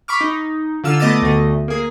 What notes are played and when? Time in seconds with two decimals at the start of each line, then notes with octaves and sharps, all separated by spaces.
0.08 B5 C#6 D6 F6
0.21 D#4
0.84 D3 F4 E6 F6
0.99 A3 B3 D#5 D6 A6 D#7
1.22 D2 A3 D#5
1.68 A#3 G#4